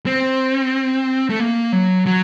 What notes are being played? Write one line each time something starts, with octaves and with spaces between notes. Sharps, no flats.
C4
A3
A#3
F#3
F#3